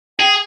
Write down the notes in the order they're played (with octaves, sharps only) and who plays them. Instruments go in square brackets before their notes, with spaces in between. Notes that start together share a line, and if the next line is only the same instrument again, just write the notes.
[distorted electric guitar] G#4 [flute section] G5